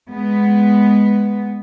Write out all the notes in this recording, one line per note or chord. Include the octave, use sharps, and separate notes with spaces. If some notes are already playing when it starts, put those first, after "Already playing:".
G#3 B3